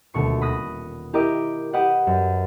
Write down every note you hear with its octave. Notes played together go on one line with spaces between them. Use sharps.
D#1 D2 B2 C#6 C#7
B5 D#6 F#6 A#6
E4 G4 A#4 D#5 D6
G4 B4 D#5 F#5
F#2